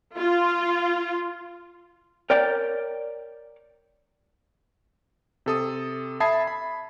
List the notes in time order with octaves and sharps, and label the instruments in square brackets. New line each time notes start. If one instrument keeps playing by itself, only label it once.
[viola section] F4
[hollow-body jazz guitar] A#4 C#5 D5 G5
[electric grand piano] C3 A4 D#6
E5 A5 B5 D#6 G#6 C7
B5